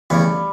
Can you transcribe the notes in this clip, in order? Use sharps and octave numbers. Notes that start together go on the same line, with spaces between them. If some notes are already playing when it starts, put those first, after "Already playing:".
E2 C#3 E3 G3 A3